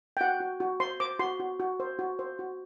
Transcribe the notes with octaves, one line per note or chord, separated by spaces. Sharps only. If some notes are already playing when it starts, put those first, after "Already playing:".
G5
F#4 F#5
F#4
F#4
C5 C6
C5 D6
F#4 C6
F#4
F#4
C5
F#4
C5
F#4